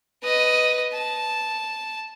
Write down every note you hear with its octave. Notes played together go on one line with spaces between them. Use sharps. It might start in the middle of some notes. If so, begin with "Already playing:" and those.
B4 D#5
A5